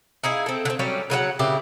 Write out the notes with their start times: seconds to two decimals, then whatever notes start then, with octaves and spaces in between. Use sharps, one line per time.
0.24 D#4 E4 G#4 F5
0.46 C4 A4
0.65 D3 C4
0.79 F#3 G3 C#4 G4
1.10 C#3 F#3 A4 F#5
1.39 A#2 C#3 E4 G4